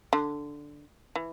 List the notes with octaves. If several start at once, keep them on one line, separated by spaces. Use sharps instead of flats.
D3
E3